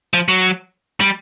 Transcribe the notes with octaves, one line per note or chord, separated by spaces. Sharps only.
F3
F#3
G3